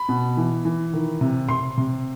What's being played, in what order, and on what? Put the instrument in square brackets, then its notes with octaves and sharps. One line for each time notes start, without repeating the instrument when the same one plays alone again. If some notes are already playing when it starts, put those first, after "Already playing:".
Already playing: [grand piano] B5
B2
E3
E3
D#3
C3
C3 C6
C3